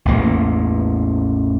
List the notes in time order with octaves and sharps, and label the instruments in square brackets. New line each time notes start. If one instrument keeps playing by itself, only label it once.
[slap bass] A1 E2 A#3